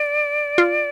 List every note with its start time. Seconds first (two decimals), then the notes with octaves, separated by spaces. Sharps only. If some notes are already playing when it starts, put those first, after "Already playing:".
Already playing: D5
0.58 F4